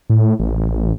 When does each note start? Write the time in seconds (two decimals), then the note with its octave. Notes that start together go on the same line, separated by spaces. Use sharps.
0.10 A2
0.40 A1